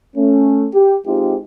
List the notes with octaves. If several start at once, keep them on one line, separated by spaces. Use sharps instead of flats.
A3 C#4
G4
G#3 C4 D#4 F4 G4